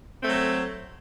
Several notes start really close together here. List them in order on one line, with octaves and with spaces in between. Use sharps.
C4 A3 F#3 A4